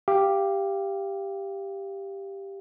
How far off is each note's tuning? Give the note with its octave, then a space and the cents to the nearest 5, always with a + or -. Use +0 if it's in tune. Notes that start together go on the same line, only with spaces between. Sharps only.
G4 +5 F5 -20